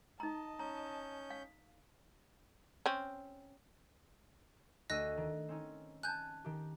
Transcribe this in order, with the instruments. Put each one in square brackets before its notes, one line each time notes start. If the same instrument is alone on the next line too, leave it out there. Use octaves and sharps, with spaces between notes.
[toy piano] D#4 A#5 [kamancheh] D#5 A5
[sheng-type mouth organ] C#4 G6 [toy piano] A#5
[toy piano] F5
[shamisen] C4 C#4
[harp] D2 E6 D#7 [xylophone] D#5 F#6 A#6
[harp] D#3
C4 C#4 D#4
[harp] G#5 A5 [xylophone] F#6 G6
[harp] D#3 G4